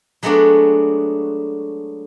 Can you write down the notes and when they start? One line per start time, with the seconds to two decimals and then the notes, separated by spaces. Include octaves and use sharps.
0.23 F#3 G#3 A3 B3 D4 F#4